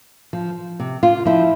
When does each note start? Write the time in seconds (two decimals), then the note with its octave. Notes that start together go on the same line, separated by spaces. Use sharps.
0.33 F3
0.80 C3
1.03 F4
1.25 F3 E4